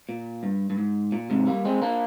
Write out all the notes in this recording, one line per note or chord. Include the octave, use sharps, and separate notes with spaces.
A#2
G2
G2
G#2
A#2
G#2 C3
G3 A#3
G#3 C4
A#3 D4